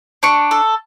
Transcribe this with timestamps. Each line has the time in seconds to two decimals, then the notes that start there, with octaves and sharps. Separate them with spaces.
0.23 D4 C#6
0.51 A4